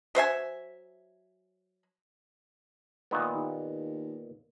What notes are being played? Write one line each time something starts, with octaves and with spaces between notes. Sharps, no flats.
F#3 C5 E5 G#5
A#2 D#3 B3
D#2